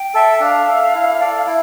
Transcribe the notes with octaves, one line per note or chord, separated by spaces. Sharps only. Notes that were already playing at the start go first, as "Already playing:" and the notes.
Already playing: G5
A4 E5
D4 F5
A4 E5
E4
A4 D5
E4